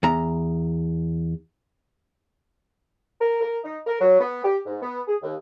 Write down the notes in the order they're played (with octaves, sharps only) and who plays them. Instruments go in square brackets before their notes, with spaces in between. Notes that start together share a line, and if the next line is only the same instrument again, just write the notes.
[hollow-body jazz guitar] E2 A#5
[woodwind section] A#4
A#4
D#4
A#4
F#3
B3
G4
G#2
B3
G#4
D#2